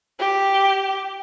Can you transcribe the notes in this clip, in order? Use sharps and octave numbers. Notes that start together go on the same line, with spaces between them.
G4